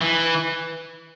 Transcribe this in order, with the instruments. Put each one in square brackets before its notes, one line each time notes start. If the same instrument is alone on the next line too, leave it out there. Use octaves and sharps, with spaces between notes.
[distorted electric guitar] E3